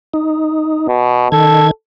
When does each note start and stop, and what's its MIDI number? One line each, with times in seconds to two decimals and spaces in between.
0.14 0.88 63
0.88 1.28 47
1.32 1.71 51
1.32 1.67 69
1.32 1.71 92